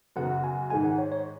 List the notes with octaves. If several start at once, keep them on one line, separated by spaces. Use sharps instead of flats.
F#2 C#3 B3 F#4 F#5
G#5
G#2 D#3 G#3 G#5
F#5
C#5
C#5